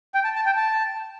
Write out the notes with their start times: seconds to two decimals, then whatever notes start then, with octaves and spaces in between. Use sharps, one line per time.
0.15 G5
0.24 A5
0.36 A5
0.46 G5
0.57 A5